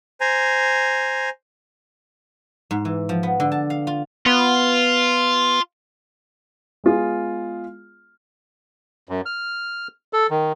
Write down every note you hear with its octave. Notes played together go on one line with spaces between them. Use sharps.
C5 G#5 A#5
G#2
E3
F3
B3
D3
A5
F5
F4
B3 F4
G#3 B3 F4 G#4
F#2
F6
A4
D#3